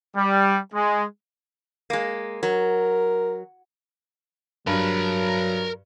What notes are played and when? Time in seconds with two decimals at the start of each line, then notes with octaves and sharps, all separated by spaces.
0.16 G3
0.74 G#3
1.90 G#3 A#3
2.43 F#3 A#4
4.67 G2 F#3 A#4 B5